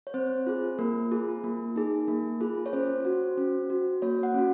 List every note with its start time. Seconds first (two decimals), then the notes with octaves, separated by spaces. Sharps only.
0.07 C#5
0.14 C4 C5
0.47 F4 G#4
0.79 A#3 A#4
1.11 F4 G#4
1.44 A#3
1.76 D#4 G#4
2.08 A#3
2.41 F4 G#4
2.66 C#5
2.73 C#4 C5
3.05 F#4
3.38 C#4
3.70 F#4
4.02 A#3 C#5
4.23 F#5
4.34 C#4 F#4